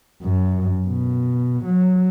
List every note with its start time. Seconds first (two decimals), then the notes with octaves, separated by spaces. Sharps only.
0.23 F#2
0.87 B2
1.65 F#3